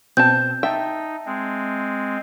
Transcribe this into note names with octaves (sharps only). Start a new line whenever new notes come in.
B2 C4 A5 G6
D#4 E5 G5 A5
G#3 C4